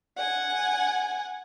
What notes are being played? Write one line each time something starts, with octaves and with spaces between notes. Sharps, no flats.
F#5 G#5